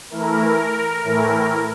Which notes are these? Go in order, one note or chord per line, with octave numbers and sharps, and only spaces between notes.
E3 A3 E4 A#4
A2 E3 A3 E4